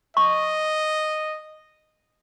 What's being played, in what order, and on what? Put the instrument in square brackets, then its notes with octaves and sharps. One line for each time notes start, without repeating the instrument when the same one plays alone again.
[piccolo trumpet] D#5 [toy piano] C#6